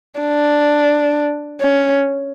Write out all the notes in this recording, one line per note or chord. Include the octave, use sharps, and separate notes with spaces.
D4
C#4